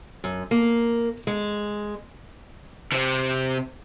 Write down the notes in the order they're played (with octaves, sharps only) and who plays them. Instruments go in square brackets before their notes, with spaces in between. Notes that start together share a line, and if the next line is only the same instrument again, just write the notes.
[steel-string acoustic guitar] F#2
A#3
G#3
[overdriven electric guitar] C3 C4